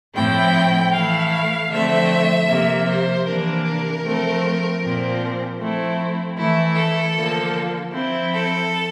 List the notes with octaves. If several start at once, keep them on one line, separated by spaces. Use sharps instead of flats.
A2 F3 A3 C4 E4 G5
E3 A3 E4 F5
D3 F3 A3 C4 E5
C3 F3 A#3
C5
C3 E3 A#3 D4 A#4
A#4
F3 A3 C4
A#2 F3 C4
F3 A3 C4 E4
E3 A3 E4
A4
D3 F3 A#3
F3 C4 E4
A4